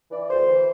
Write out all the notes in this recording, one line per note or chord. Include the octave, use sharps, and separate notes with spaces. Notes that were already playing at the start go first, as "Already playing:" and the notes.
E3 D5
D2 C5
E3